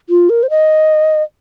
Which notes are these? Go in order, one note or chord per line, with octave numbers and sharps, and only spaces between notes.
F4
A#4
C5
D#5